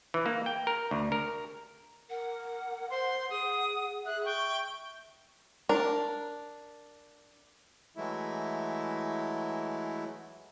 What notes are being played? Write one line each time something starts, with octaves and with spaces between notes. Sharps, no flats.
E3
A#3
G5
A#4
D2
A#4
A#4 F#5
C5 F#5 C6
G#4 D#6
G#4 E5 F#6
G5 C#6
D4 A#4
E3 F#3 G#3 A3 E4